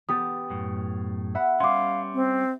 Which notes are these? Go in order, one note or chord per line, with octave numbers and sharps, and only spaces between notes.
B3 G4 D#6 A6
F#2 A2
E5 F#5 B5
G3 C#4 F5 C6 D6
C4